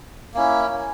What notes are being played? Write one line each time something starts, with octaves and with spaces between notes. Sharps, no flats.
A#3 C#4 E4